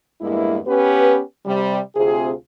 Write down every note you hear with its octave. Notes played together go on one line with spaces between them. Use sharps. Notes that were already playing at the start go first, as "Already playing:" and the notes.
E2 G2 G#3 A#3 E4
B3 C#4 G4 B4
C3 G3
D2 C3 C4 F4 G#4